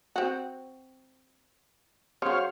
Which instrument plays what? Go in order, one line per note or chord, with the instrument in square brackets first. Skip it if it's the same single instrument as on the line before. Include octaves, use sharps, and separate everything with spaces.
[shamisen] C4 F#4
[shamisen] C#3 F#3 [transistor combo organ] C5 C#5 F5